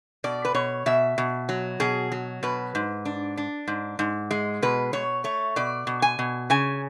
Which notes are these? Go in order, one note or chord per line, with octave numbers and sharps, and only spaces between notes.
B2 D5
B4
B2 C#5
B2 E5
B2
F#3
B2 G#4
F#3
B2 B4
G#2
D4
D4
G#2
G#2
G#3
B2 B4
B2 C#5
A3 C#5
B2 D5
B2
G#5
B2
C#3 G#5